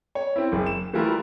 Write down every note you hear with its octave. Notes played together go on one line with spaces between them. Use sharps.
C#5
C4 E4
F#1
E7
E3 G3 A3 E4 F4 A#4